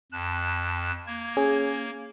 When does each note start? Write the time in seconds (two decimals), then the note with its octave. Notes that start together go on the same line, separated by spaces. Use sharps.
0.12 F2 A5 F#6
1.07 A#3 G#6
1.37 C#4 G#4